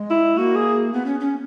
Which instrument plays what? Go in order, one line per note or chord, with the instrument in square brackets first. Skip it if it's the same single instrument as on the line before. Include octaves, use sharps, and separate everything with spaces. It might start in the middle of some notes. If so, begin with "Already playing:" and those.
Already playing: [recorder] G#3
[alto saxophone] E4
[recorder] A#3 [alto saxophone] F#4
[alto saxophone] G#4
[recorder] B3
C#4
C#4